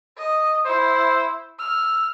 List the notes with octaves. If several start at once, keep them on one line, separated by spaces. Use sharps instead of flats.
D#5
E4 C5
E6 F6